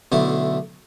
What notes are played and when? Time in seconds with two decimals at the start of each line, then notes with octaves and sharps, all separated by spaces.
0.12 B1 D3 A3 E4